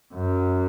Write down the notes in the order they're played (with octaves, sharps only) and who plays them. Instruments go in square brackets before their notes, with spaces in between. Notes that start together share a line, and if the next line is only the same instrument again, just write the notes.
[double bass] F#2